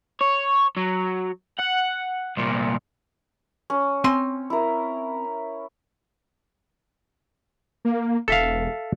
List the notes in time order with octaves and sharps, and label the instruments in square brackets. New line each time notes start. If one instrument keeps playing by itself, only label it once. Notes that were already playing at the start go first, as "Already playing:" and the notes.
[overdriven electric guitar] C#5
F#3
F#5
C2 A#2
[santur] C#4
[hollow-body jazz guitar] C4 G#5 C6
[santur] E4 A#4
[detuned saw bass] A#3
[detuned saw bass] E1 [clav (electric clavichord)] A4 E5 F5